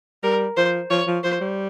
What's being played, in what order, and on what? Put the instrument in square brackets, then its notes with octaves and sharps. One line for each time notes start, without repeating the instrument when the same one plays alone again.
[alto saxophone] G3 [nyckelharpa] A#4
[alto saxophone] F3 [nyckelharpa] C5
[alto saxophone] F3 [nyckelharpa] C#5
[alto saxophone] F3
[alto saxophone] F3 [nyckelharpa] C5
[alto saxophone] G3